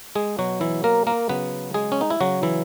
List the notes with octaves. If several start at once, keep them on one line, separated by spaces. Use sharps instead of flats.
G#3 G#4
B2 F#3 F#4
E3 E4
A#3 A#4
A#3 A#4
C#3 F#3 B3 B4
G#3 G#4
C#4
D#4
E4
C#3 F#3 F#4
E3 E4